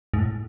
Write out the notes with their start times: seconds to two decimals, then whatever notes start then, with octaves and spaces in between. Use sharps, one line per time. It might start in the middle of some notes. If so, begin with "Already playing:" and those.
0.14 G#2
0.18 A2